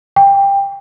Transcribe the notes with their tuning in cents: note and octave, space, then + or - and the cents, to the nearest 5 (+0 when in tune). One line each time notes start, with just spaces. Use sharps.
G5 +20